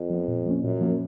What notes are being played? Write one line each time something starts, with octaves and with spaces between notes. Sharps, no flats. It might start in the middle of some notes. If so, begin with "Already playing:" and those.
Already playing: F2
F3 B3
A#2
F3 A#3 C#4
F#2 A#2
F3 A#3 C#4